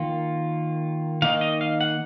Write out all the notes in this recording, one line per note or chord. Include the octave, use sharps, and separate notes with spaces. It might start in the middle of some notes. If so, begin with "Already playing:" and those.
Already playing: D#3 A#3 F4
D#3 A#3 D#4 F5
D#5
F5
F#5